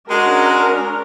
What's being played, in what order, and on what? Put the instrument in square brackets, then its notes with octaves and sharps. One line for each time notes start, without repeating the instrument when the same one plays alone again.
[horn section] G#3 F#4 [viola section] C#4 D4 A#4